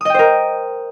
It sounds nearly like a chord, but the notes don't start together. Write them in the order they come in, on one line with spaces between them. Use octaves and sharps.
D#6 D#5 G5 C5 A#4